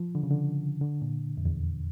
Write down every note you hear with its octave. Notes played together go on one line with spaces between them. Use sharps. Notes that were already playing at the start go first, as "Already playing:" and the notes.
Already playing: F3
D3
C#3
D3
D3
A#2
F2
E2